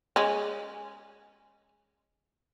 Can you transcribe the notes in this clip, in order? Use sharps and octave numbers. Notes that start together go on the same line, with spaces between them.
G#3 C#4